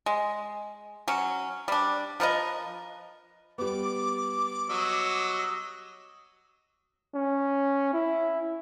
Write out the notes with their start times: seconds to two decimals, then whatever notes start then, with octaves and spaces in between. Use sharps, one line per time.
0.06 G#3
1.08 F#3 C#4
1.68 G3 D4
2.20 F3 A#4 B4 D#5
3.58 G3 B3 D6
4.70 F#3 D#5 E6
7.15 C#4
7.93 E4